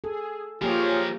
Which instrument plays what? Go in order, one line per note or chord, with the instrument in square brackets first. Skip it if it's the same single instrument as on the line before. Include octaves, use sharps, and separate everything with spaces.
[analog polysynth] G#4 [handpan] A4
[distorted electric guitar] F3 A#4 [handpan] A#3 G4 [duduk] F4 [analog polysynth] G#4 C#5